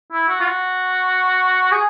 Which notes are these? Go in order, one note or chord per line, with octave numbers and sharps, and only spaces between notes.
E4
F#4
F4
F#4
G#4